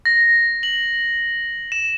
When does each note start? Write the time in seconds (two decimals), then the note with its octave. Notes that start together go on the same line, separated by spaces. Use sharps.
0.05 A#6
0.63 F#7
1.72 E7